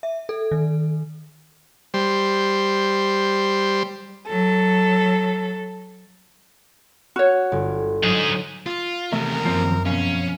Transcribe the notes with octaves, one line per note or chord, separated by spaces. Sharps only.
E5
A4
D#3
G3 C5
F#3 A4
F#4 C#5 F6 E7
G1
G#2 F#3 D4 D#4 G#4
F4
E2 C3 D#3 A3 A#4 E5
F#2 F3 A#3 C4
F2 B2 C#4 F5